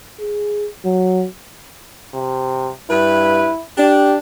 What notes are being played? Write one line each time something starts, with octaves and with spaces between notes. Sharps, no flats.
G#4
F#3
C3
G2 E4 B4
D4 G4